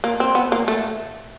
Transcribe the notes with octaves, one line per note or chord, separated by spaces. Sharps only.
A#3
C4
B3
A#3
A3